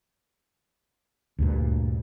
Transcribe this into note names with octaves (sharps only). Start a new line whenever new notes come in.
D2 G2 A#2